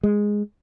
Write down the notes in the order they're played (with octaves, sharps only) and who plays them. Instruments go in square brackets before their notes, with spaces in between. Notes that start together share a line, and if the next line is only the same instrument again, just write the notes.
[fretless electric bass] G#3